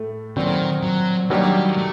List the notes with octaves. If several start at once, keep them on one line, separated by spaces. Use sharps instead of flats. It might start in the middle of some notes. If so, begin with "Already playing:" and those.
Already playing: A2 A3
A#2 D#3 F#3 C4 F#4
F#3
D#3 F#3 G3 A#3 D4 G4
A3